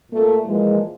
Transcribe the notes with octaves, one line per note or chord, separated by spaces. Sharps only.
A#2 A3
A#2 E3 F3 G#3